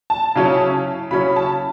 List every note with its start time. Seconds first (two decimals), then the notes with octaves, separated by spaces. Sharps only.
0.10 A5
0.35 C#3 F#3 C#4 E4
1.11 C#3 F#3 C#4 E4 B5
1.36 A5